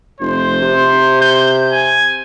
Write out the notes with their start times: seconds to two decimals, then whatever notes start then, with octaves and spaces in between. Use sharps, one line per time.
0.20 F1 C5
0.61 C3
1.21 G6
1.72 G#5